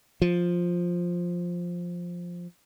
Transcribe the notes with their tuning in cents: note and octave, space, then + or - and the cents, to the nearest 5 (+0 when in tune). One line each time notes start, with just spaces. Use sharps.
F3 +5